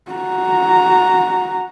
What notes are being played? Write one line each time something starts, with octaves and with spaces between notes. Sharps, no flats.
F#4 A#5